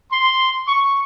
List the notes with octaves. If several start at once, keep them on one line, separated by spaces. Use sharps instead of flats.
C6
C#6